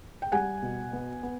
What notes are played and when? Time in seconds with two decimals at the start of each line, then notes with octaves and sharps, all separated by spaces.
0.22 G5
0.32 G3 F#5 G#5
0.62 B2
0.93 B3
1.23 B3